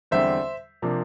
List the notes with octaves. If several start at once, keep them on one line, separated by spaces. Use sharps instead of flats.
E2 D3 G3 C4 C5 E5
C3 F3 A#3 D4